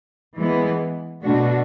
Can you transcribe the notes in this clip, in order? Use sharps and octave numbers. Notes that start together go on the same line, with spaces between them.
E3 G#3 B3
B2 A3 D4 F#4